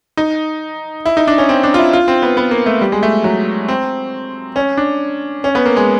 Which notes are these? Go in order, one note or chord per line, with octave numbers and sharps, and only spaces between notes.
D#4
E4
D#4
D4
C#4
C4
D4
F4
E4
F4
C4
B3
B3
A#3
A3
G3
G#3
A3
F#3
C4
C#4
D4
C#4
B3
A#3
G#3